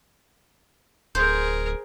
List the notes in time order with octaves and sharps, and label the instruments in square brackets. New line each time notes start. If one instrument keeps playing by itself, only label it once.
[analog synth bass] D1 [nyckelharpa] G#4 A#4 [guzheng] C5